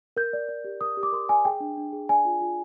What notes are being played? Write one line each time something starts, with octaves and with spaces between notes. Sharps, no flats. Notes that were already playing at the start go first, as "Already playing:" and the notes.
A#4 G6
D5
D5
G4
A#4 D#6
G4
D6
A#4 C6
D5 G#5
G#4 G5
D4
D4
G#4
D5 G#5
F4
F4